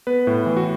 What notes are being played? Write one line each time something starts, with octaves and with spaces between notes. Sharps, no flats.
B3 B4
A2
E3
F#4